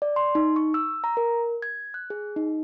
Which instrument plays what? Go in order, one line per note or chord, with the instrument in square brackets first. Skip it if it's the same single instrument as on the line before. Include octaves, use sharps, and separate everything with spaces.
[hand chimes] D5
C6
D#4
C#6
E6
A#5
A#4
G#6
F#6
G#4
D#4